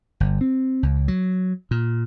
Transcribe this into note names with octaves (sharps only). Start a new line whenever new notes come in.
G1
C4
C#2
F#3
A#2